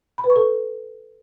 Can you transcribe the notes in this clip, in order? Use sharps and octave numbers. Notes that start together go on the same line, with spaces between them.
B5
B4
C#6
A4